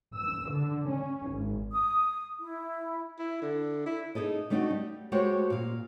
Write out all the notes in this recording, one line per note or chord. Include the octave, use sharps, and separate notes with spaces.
E6
D3
C#4
G#1
D#6
E4
E4
D3
E4
D#4 G#4 A4 D#5
G3 A3 D4 D#4 F4 F#4
G3
G#3 A3 F#4 G4 C5 C#5
A#2 F5